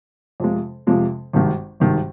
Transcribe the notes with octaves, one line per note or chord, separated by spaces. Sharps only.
F2 C3 F3 G#3
F2 C3 F3 G#3
G#1 G2 D#3
G#1 G2 D#3